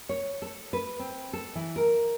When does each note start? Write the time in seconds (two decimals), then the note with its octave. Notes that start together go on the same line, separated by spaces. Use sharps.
0.09 C#5
0.42 A4
0.73 B4
0.99 C4
1.33 A4
1.55 E3
1.76 A#4